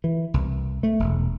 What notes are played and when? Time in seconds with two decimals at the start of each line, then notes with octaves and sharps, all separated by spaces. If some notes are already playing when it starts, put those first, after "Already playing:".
0.04 E3
0.34 C2
0.83 A3
0.99 E1